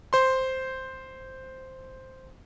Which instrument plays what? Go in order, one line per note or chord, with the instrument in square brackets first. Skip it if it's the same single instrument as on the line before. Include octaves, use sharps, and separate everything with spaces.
[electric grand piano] C5 C6